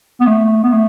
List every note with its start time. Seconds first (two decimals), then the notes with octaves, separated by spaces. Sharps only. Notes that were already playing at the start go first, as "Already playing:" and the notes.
0.20 B3
0.27 A3
0.64 B3
0.73 A3